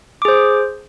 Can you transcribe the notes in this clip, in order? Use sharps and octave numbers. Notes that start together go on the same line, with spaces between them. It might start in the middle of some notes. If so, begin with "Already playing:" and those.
G#4 C5 D6